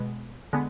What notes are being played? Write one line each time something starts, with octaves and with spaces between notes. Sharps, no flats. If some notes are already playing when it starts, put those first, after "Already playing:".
Already playing: B2 G#3 B3
D3 G#3 B3